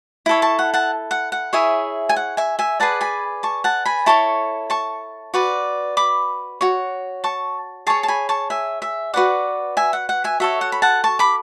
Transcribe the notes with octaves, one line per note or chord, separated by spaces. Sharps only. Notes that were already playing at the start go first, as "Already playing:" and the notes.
E4 A4 C#5
A5 C#6
F#5
F#5 A5
F#5
F#5
E4 G#4 C#5 E5 G#5
G#5
F#5
E5 G#5
E5 G#5
G#4 B4 D5 F#5 A5
G#5 B5
A5 C#6
F#5 A5
G#5 B5
E4 A4 C#5 A5 C#6
A5 C#6
F#4 B4 D5
B5 D6
F#4 C#5
A5 C#6
G#4 C#5 A5 C#6
A5
G#5 B5
A5 C#6
E5 G#5
E5
F#4 B4 D5 F#5
E5 G#5
F#5
F#5
E5 G#5
F#4 A4 C#5 E5
F#5
B5
F#5 A5
A5 C#6
B5 D6